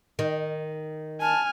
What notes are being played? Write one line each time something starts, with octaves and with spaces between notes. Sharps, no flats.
D#3
G#5 A5 F6